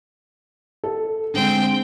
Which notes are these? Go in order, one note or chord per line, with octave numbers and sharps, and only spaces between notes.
A4
D3 G#3 C4 G5